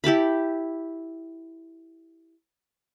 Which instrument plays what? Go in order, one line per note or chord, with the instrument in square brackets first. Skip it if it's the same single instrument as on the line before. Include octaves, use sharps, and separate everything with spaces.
[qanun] E4 G4 A5 B5